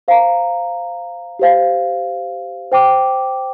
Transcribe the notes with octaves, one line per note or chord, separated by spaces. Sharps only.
C5 F5 A#5
G4 C5 F5
C5 G5 D6